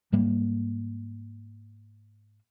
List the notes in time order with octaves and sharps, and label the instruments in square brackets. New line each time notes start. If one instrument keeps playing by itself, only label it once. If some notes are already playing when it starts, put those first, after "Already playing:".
[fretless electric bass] G#2 G3 A#3